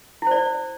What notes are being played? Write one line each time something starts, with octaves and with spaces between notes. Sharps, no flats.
E4 C5 D5